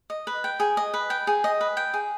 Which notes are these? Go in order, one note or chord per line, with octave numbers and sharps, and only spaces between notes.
D#5
B4
G5
G#4
D#5
B4
G5
G#4
D#5
B4
G5
G#4